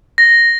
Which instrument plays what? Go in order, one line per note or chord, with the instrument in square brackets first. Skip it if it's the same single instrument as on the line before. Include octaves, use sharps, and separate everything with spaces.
[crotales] A#6